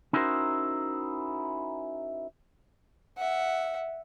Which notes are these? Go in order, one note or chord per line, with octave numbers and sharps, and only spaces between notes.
C#4 D#4 E4 F#4 A#4 C5
E5 F#5